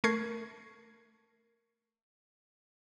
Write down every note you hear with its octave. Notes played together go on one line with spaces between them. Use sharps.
A3 A#4 C#6 G#6 C7